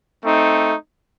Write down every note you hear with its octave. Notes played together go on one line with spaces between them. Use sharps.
A3 C4 D#4